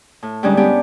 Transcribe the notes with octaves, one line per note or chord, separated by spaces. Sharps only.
A2
G2 D3 G3 G#3 C#4 D#4
B3 C#4 D4 G4